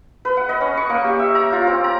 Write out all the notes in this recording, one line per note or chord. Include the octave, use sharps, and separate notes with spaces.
B4
F#5
D#5
C#4
C#6
A#3
G4
E5
A#5
F4
C4
A#5